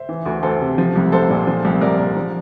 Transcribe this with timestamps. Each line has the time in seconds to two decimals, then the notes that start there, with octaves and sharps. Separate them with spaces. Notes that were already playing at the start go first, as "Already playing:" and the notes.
Already playing: C5 E5
0.09 E3
0.26 D2
0.43 D2 A4 C5
0.61 C3
0.78 F3
0.96 C2
1.12 C2 A4 C5
1.30 A#2
1.47 F3
1.65 C2
1.81 C2 A#4 D5
1.99 A#2
2.17 F3